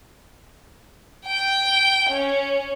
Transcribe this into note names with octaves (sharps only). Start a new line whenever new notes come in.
G5
C#4